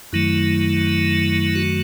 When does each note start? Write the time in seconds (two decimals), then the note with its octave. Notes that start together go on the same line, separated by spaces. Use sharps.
0.13 F#2 D#3 F#3 A3 E4
1.55 F#4